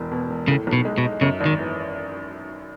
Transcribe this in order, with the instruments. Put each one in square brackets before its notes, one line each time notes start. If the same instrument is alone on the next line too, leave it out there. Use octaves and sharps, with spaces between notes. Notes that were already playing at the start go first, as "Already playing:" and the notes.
Already playing: [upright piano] E1 E2
B2
E1
[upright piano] A2 [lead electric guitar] C#3
[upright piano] B1
[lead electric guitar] B2
[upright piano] G#3
[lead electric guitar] B2
[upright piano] D#4
[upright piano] F#2 [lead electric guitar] C#3
[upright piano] G#1
[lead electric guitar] D#3
[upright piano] E3